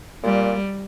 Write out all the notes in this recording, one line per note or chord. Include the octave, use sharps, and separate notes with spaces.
A#2 G3